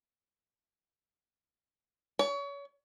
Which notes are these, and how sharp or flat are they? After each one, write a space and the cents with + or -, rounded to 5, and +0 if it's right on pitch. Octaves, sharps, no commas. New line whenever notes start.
C#5 +30